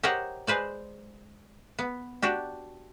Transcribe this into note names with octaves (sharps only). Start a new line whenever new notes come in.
G4 A#4 C5 C#5 D#5 F#5
G#3 B4 C5 D5
B3
D4 F#4 G4